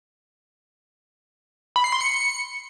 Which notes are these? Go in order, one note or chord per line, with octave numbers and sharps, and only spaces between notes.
B5
C7
C6
C#7